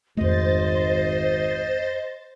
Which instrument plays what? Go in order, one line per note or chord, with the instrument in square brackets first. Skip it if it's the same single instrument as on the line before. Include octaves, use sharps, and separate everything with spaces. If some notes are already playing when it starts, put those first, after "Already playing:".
[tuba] G#1 [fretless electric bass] F2 A3 [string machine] C5 A6 [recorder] D#5